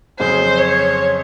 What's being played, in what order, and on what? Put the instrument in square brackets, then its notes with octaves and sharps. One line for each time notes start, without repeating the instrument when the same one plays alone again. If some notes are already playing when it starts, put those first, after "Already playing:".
[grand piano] F2 C#3 F#3 C#4 G#4 [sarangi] C5
[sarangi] C#5